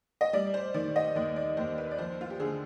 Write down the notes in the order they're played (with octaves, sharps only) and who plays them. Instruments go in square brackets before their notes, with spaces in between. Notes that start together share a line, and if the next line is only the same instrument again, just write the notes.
[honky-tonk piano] D#5
G3 D5
C5
D#3 D5
D#5
D#2 D5
D5
D#2 C5
B4
D5
F3 C5
F4
G4
D3 G#4